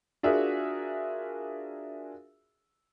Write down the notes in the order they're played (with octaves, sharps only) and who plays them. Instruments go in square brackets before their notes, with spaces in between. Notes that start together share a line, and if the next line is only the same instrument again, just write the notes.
[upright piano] D4 F4 F#4 G#4 A#4 E5